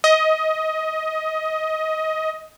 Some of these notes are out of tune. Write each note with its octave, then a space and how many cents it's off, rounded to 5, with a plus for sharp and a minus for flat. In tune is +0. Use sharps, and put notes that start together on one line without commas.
D#5 +20